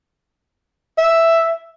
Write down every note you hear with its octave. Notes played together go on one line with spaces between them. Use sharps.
E5